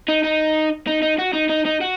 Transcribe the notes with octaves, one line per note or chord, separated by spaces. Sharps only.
D#4
D#4
D#4
D#4
F#4
D#4
D#4
D#4
F#4